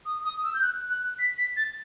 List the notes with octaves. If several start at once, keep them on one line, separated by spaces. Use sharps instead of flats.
D#6
D#6
E6
G6
F#6
F#6
B6
B6
A6